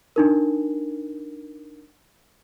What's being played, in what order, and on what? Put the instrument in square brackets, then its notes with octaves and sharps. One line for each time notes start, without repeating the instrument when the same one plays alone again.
[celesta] D4 D#4 A#4